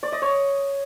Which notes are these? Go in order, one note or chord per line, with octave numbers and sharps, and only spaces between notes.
D5
D#5
C#5